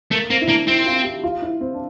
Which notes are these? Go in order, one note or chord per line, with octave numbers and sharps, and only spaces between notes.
A3 A#3
A#3 C4
E4
A#3 D4
C4 E4
F4
G4
F4
E4
C4
D4